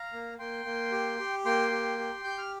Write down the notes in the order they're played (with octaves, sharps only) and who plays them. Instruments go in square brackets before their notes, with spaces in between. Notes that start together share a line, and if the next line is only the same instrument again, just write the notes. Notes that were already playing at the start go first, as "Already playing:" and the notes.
Already playing: [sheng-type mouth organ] F5 A#5
A#3
A#3 G5 C6
A#3
G4
G4
A#3 G5 C6
G4
G4
G4 G6
F6